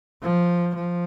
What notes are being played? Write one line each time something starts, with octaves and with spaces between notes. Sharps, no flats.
F3
F3